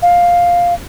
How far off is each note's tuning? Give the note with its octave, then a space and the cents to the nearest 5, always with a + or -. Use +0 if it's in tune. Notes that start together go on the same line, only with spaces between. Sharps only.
F5 +5